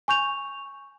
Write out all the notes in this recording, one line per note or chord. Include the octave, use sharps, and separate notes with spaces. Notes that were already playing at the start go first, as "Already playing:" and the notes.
G#5 C#6 G6 F7